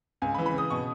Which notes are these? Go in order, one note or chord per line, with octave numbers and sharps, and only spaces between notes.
C#2 G#5
B5
E3
B5
C#3 D#6
B2 C#6